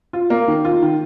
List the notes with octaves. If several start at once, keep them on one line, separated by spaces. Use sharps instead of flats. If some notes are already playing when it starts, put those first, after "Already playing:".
F4
A#3
D#3
F4
D#3